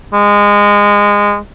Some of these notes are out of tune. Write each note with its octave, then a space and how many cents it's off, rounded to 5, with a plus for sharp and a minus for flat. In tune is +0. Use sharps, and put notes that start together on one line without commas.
G#3 -20